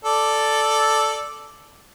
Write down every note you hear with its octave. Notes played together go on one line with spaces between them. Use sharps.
A4 D5